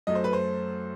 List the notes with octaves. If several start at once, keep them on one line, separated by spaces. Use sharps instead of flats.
F#2 F#3 A3 D#5
C5
B4
C5